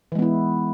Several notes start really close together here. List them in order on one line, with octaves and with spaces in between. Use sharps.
E3 G#3 B3 E4